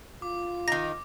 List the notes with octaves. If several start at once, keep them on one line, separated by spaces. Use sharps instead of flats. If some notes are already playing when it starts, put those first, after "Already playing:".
F4 D6
D#3 D#4 A#6